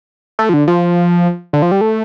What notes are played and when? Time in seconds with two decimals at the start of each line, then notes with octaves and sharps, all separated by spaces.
0.39 A3
0.49 F3
0.54 D3
0.68 F3
1.53 D3
1.62 F3
1.72 G3
1.81 A3